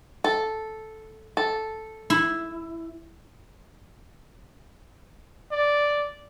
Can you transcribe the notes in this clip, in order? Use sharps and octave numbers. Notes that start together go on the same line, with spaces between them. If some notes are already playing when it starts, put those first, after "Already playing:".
A4
A4
E4
D5